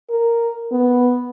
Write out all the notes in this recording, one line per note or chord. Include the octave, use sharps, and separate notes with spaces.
A#4
B3